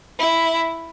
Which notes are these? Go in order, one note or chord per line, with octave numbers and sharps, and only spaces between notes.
E4